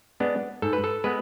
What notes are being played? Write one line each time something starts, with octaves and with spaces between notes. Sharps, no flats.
G#3 B3 D4
G#2 A4
B4
A4
G#3 B3 B4